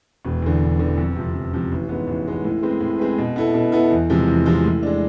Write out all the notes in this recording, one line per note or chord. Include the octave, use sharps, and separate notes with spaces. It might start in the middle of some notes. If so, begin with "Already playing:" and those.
E1
E2 D3
E1
E2 D3
F2
C3 F3
F2
C3 F3
A1
G#2 G#3 B3
A1
G#2 G#3 B3
A2
G#3 C4 G#4 B4
A2
G#3 C4 G#4 B4
B2
B3 E4 A4
B2
B3 E4 A4
E2
C3 F3 G#3
E2
C3 F3 G#3
A2
G#3 D4